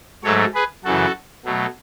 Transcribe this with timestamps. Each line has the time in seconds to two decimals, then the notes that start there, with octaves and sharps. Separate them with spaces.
0.24 G#2 F#3 A3 A4 C#5
0.54 G#4 B4
0.84 F#2 C#3 E3 F#4 A4
1.45 B2 F#3 A3